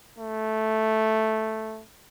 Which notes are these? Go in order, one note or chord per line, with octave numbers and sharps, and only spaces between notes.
A3